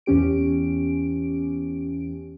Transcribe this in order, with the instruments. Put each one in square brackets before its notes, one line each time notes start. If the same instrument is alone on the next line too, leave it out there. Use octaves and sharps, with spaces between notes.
[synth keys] E2 E3 C#4 G4 D7